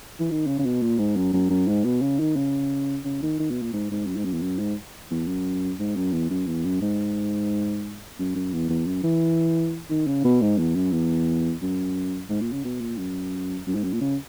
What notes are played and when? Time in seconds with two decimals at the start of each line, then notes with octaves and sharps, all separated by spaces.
0.20 E3
0.31 D#3
0.47 C#3
0.59 C#3
0.65 B2
0.82 A#2
0.99 G#2
1.16 F#2
1.33 F#2
1.50 F#2
1.68 G#2
1.84 B2
2.01 C#3
2.19 D#3
2.36 C#3
3.05 C#3
3.22 D#3
3.39 D#3
3.51 B2
3.62 A#2
3.73 G#2
3.91 G#2
4.07 F#2
4.16 G#2
4.25 F#2
4.33 E2
4.42 F#2
4.59 G#2
5.11 E2
5.27 F#2
5.79 G#2
5.96 F#2
6.12 E2
6.30 F#2
6.47 E2
6.65 F#2
6.81 G#2
8.19 F#2
8.35 F#2
8.53 E2
8.69 E2
8.86 F#2
9.03 E3
9.90 D#3
10.07 C#3
10.24 B2
10.42 G#2
10.59 E2
10.75 F#2
10.92 E2
11.62 F#2
12.29 G#2
12.41 A#2
12.52 C#3
12.64 B2
12.81 A#2
12.97 F#2
13.67 F#2
13.75 G#2
13.84 F#2
13.93 A#2
14.01 C#3